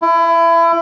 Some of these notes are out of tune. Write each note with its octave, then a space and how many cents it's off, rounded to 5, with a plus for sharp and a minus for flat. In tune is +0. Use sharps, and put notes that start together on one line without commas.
E4 +25